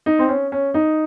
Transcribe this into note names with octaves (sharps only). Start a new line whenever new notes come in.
D#4
C4
C#4
C#4
D#4